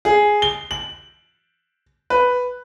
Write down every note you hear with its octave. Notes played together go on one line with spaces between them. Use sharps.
G#4
G7
F#7
B4